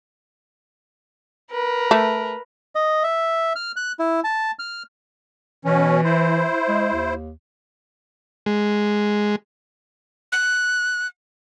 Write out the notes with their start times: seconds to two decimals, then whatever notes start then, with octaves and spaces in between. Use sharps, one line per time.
1.50 A#4 B4
1.91 A3
2.75 D#5
3.03 E5
3.56 F6
3.76 F#6
3.99 E4
4.24 A5
4.59 F6
5.65 B2 E3 C#4
6.04 E4 C5
6.68 G#3
6.94 D#2
8.46 G#3
10.32 F#6